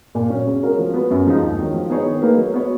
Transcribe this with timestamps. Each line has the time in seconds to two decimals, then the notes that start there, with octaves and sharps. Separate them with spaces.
0.15 A#2
0.30 F#3 C#4
0.47 C#3
0.63 G#3 C#4 F#4 A#4
0.79 F3
0.94 B3 F#4 B4
1.11 F#2
1.27 C#3 F3 G#3 D#4
1.42 D#2
1.59 D#3 F#3
1.74 F3
1.90 B3 D#4 G#4 C#5
2.06 D#3
2.22 A#3 D#4 G#4 B4
2.37 F#3
2.54 B3 F#4 C#5